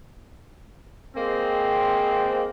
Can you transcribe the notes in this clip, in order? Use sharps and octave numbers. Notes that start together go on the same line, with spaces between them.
G#3 A#3 C4